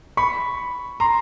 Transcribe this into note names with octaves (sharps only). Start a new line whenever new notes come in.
B5 C#6
A#5 C6